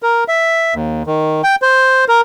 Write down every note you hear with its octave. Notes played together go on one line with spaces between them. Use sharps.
A#4
E5
D#2
D#3
G5
C5
A#4